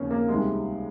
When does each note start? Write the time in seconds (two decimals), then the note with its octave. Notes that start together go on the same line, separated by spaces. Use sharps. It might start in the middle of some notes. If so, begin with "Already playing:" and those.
Already playing: D#2 C#3 F3 A#3 C#4
0.11 A#3
0.28 C#2 C3 D#3 G3 G#3